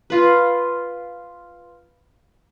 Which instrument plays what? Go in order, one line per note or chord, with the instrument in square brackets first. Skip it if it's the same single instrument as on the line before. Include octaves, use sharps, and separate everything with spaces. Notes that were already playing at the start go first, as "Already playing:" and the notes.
[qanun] F4 B4